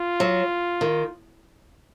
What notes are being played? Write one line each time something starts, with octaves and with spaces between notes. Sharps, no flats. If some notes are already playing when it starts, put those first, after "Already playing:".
Already playing: F4
F#3
D#3